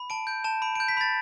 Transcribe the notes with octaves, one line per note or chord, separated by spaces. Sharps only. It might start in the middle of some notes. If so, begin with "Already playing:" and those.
Already playing: B5
A5 D7
G6 D7
A5 E7
B5 D7
G6 D7
B6
B5 A6